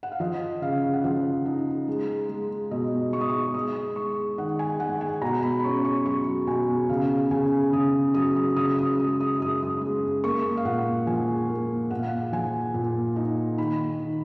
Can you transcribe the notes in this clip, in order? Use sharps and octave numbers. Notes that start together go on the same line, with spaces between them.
F#5
F5
F3 D#5
C#3 F5
F#5
F3 F5
D#4
G#3
G#3
B2 D#5
G#3 C#6
D#6
C#6
G#3 D#6
G#3 C#6
D#3 F#5
G#5
G#3 F#5
G#5
B2 A#5
B5
B5
C#4 C#6
C#6
F#3 C#6
B2 G#5
C#3 F5
C#3 G#5
C#3 D#6
F#3 D#6
D#6
C#3 D#6
D#6
G#3 D#6
D#6
F#2 D#6
D#6
G#3
A#3 C#6
F5
A#2 F#5
F3 G#5
A#3
A#2 F#5
F5
F#5
F3 G#5
A#2
D#4
D#3 B5
D#3